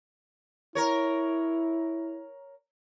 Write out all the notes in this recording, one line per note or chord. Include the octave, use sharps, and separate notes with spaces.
E4 A#4 C#5